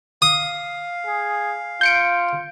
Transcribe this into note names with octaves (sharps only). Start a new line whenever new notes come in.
F5 D#6
G#4
F4 G6 C#7 D7